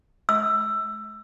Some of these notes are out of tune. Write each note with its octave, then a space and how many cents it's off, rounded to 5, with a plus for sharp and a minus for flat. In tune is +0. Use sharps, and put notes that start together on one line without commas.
E6 +15